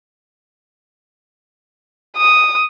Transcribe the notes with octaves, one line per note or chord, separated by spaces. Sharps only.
D#6